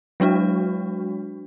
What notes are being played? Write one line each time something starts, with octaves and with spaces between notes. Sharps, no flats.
F#3 G#3 D4 F#4